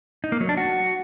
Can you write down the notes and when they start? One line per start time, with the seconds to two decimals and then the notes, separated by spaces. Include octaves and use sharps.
0.24 D#4
0.32 A#3
0.41 F#3
0.49 D4
0.57 F#4